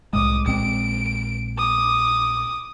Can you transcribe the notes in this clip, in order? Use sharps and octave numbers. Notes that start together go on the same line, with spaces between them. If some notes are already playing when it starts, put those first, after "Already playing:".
C2 A2 G#3 D6 D#6
A#1 G#3 C4 D7
D6 D#6